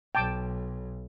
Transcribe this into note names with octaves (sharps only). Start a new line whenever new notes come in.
B1 G5 A5 D6